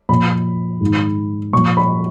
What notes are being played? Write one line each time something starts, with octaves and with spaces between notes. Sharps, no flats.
A#2 F3 B5
G#2
D#3
A#2 F3 C#6
B5